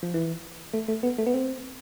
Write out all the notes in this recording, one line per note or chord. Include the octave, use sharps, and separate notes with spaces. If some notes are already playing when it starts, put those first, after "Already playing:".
F3
E3
A3
A3
B3
A3
B3
C4